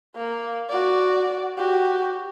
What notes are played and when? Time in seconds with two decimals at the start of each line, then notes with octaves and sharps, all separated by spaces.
0.15 A#3
0.69 F#4 D5
1.58 F#4 G4